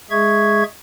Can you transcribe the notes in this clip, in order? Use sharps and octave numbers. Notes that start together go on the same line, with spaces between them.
G#3 G#4 E5 C#6 G#6